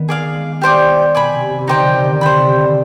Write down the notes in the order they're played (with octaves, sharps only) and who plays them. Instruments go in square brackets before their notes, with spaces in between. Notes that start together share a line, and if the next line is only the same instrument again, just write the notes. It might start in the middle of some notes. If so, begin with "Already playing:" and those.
Already playing: [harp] D#3 B3
[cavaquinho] G#4 D5 F5
[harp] G#3
[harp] G3 [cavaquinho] G4 C5 G5 D6
[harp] B2 [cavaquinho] D5 G#5 B5
[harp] C3
C3
C3
[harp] D3 [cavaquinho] D#4 G4 C5 G5
[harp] F3
D#3
C3
D3
C3
[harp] D3 [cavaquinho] C5 G5 B5
[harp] C3
D3
D#3